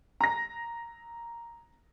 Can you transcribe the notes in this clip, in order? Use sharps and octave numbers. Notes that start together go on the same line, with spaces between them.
A#5 A#6